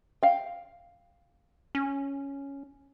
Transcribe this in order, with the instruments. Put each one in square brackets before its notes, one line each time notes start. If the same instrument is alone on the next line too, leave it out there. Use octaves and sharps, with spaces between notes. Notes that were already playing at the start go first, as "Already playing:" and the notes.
[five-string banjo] F5 G5
[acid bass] C#4